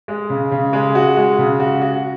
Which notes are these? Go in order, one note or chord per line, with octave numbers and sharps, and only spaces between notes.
G#3
C#3
C#3
G#3
F#4
G#3
C#3
F#4
F#4